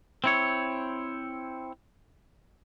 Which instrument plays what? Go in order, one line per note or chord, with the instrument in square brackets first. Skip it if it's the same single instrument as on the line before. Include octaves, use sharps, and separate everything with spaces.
[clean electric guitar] C4 E4 C#5